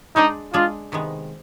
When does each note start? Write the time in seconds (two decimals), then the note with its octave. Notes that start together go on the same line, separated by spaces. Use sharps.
0.15 G#3 D4 D#4 G#4 D5
0.53 G#3 D4 F4 G#4 D5
0.92 C3 D#3 G#3 B3